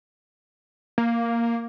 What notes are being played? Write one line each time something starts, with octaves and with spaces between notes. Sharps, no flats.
A#3